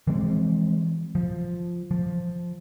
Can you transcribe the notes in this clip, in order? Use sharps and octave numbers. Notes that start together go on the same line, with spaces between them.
E3 F3 G#3 C4
F3
F3